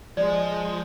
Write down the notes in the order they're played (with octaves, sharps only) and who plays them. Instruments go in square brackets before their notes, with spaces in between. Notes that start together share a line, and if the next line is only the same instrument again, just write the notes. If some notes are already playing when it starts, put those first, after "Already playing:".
[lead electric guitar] F3 [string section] G#3 [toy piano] D5